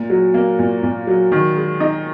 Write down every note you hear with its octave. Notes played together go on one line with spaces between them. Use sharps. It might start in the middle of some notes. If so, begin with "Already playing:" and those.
Already playing: A#2
F#3
A#3
A#2
A#2
F#3
D#3
G#3
D#4